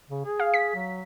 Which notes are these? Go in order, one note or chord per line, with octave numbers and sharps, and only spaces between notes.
C#3
G#4
F5
B6
F#3